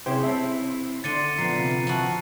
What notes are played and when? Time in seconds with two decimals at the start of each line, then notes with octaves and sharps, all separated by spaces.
0.06 C3 C#4 E4 G4 G#4 C5
0.24 C4 E4 E5 A5
1.04 D3 D5 C6 A6 C#7 D#7
1.38 A#2 F3 B3 A#5 C7
1.56 C3 F4 B4
1.87 F3 E4 F#4